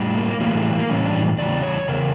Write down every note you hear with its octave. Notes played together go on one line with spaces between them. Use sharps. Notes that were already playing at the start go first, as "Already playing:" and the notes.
Already playing: A2 G3
A#3
A2 E3 G3 A#3
A3
A#3
A2 E3 G3 C#4
D4
E2 C#3 G3 D5
C#5
E2 C#3 A#4